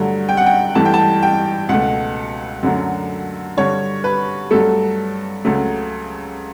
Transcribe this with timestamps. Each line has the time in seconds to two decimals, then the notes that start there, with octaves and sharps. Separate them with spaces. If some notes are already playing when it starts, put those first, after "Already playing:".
Already playing: G2 D3 F#3 A3
0.29 G5
0.37 F#5
0.46 G5
0.75 G2 E3 A3 A5
0.85 G5
0.94 A5
1.23 G5
1.69 C#2 B2 A3 F#5
2.63 F#2 D3 F#3 A3
3.57 G2 D3 G3 C#5
4.04 B4
4.51 G2 F#3 A3 A4
5.45 C#2 C#3 F#3 A3